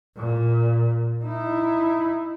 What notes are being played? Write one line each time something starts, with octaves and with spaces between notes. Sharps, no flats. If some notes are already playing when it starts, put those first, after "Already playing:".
A#2
D#4 E4